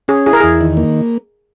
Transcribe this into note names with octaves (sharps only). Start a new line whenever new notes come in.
C#4 G#4
E4 G#4
A#4
E2 G#4
D#3
A#3